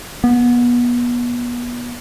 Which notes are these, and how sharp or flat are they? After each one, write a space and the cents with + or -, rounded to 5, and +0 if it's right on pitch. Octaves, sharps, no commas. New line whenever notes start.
B3 -30